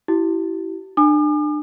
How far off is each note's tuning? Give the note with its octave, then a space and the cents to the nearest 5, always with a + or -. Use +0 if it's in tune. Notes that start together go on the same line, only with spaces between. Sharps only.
E4 +0 G4 -40
D4 +35 G#5 +0 D6 +45